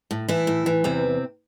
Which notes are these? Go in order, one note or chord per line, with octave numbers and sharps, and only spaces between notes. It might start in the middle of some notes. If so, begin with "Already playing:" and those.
A2
A2 E3 E4
A2
E3
E2 C3 C4